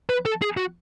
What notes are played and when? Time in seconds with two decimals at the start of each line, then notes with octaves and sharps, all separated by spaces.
0.09 B4
0.25 A4
0.42 G#4
0.57 F#4